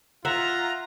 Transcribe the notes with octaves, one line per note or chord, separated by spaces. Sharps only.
F4 E5 F#5 A#5